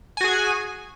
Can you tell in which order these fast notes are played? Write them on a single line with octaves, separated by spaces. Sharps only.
G#5 F#4 G#4